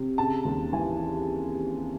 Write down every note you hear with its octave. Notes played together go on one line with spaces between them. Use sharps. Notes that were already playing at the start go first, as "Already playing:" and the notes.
Already playing: C3
C#3 A5
D#2
E3 G#5